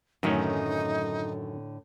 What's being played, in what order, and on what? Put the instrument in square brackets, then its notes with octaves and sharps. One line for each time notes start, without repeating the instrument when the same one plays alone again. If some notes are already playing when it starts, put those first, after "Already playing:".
[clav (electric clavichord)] F#2 D#3 C#4 [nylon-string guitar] A2 D3 A3 [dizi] D#4